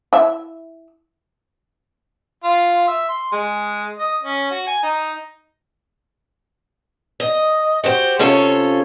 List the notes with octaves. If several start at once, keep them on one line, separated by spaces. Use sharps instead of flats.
E4 E5
F4
E5
C6
G#3
D#5
C#4
F#4
G#5
D#4
D#5
F#4 G4 C5
C3 C#4 F4 A4 C#5